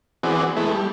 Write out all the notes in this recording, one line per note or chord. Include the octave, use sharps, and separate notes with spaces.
E3 B3 C4 F#4 G#4 D5
G#3 A3 B3 E4
G3